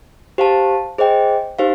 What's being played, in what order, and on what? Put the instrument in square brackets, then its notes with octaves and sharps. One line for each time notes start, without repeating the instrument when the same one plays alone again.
[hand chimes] G4 C5 F5 A5
G#4 C5 D#5 G5
D#4 G4 C5 F5